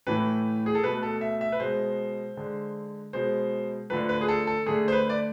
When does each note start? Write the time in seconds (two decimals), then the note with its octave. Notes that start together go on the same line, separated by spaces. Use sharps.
0.07 A2 E3 A3 B4
0.66 G#4
0.75 A4
0.83 B2 A3 B4
1.03 A4
1.21 E5
1.41 E5
1.52 B4
1.60 B2 G#3 C5
2.37 D3 G#3
3.13 B2 G#3 C5
3.90 D3 F3 A3 B4
4.09 B4
4.21 G#4
4.28 A4
4.47 A4
4.66 D3 A3 G#4
4.88 C5
4.92 B4
5.10 D5